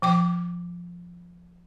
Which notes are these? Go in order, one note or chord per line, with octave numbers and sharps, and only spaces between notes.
F3 G5 D6